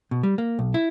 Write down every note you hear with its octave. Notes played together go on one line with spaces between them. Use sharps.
B2
G3
A#3
B1
E4